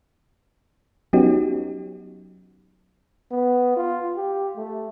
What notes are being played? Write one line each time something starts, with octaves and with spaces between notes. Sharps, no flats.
F#3 B3 C#4 D#4 F#4 G4
B3
F4
G4
A3